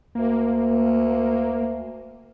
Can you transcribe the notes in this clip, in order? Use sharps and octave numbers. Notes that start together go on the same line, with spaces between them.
D2 A#3